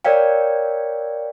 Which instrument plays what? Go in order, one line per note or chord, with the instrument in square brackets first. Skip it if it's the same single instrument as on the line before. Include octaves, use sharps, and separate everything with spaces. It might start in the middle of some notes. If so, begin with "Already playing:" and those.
[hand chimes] A#4 C#5 D5 F5 G5